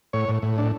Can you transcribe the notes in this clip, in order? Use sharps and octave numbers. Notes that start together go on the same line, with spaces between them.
A2 C#5
A2
A2
D4